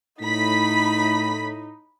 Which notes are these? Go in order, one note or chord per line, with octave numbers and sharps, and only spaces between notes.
A2 D#4 B5 B6